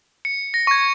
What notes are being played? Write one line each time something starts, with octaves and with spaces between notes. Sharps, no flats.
C#7
A#6
C#6 G#6